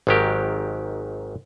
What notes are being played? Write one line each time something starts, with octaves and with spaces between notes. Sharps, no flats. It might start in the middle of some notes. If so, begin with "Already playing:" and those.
G#1 G#2 D#3 F#3 G4 A#4